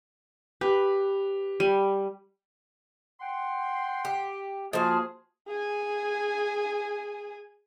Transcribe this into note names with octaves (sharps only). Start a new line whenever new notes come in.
G4 B4
G3 D#7
F#5 G5 C6
G4
F3 A#3 F#4 G#4 C5
G#4 G#5